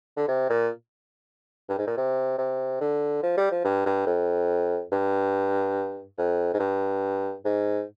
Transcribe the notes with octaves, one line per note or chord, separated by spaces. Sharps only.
D3
C3
A#2
G2
G#2
A#2
C3
C3
D3
F3
G3
F3
G2
G2
F2
G2
F2
G#2
G2
G#2